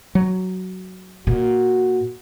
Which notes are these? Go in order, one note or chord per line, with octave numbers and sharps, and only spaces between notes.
F#3
A#2 F#4